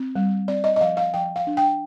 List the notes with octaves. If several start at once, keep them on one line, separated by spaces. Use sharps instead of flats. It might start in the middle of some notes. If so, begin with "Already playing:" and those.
Already playing: C4
G3
C4 D5
D#5
D#5
F3 F5
F5
F3 G5
F5
D4
G5